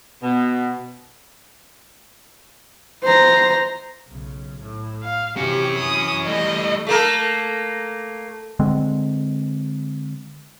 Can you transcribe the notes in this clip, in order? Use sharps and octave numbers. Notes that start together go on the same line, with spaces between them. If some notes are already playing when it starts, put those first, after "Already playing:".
B2
C5 A#5
B1 C#3
A2
F5
C3 E3 C#4 F#4 G4
E3 D#6
G3 A3 D#5
A3 A#3 A#4
D3 G#3 C4